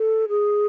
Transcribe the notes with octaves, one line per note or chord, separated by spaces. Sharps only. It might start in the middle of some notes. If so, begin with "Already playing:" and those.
Already playing: A4
G#4